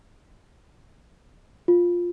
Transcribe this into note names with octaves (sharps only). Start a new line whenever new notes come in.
F4